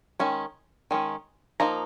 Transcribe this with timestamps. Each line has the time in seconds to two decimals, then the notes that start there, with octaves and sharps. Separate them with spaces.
0.20 D#3 G#3 C#4
0.91 D#3 G#3 C#4
1.60 F3 A#3 D#4 A#5